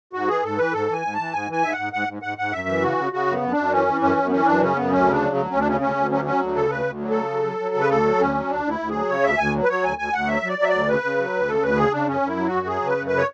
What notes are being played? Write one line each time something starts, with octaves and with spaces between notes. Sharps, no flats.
G#2 F#4
E3 G#4
G#2 A4
E3 B4
G#2 A4
E3 G#5
G#2
A5
E3
G#2 G#5
E3 G#5
G#2 E5
G#2 F#5
G#2 F#5
G#2
G#2 F#5
G#2 F#5
F#2 E5
E3
C#3 F#4
C#3
C#3 F#4
F#2
B3
F#2
D4
F#2
E3 C#4
E3
F#2 C#4
F#2
B3
E3 C#4
F#2 D4
C#3 C#4
F#2 B3
D2 C#4
C#3
D4
F#3
D2
D2 C#4
D4
C#3 C#4
D2 C#4
D2
F#3 C#4
F#3 C#4
D2
C#3 A4
D2 B4
D2
F#3
A4
C#3
F#3
F#3
F#3
C#3
B4
D2 A4
F#3
D2 C#4
F#3
D2 D4
D2 E4
D2
F#3 G#4
C#3 C#5
D2 E5
D2 G#5
F#3
B4
F#3 C#5
D2 G#5
D2 G#5
D2 F#5
F#3 E5
F#3 D5
F#3 E5
D2 D5
C#3 B4
C#3
F#3
D2
C#3 A4
D2 B4
C#3 G#4
C#3 D4
F#2 C#4
F#2 E4
F#3
F#2 F#4
F#3 G#4
C#3 B4
F#2
C#3 B4
C#5